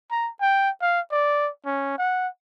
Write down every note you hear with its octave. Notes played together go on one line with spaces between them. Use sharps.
A#5
G5
F5
D5
C#4
F#5